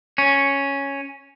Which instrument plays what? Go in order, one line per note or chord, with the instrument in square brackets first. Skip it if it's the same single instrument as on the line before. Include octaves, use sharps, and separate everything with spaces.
[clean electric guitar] C#4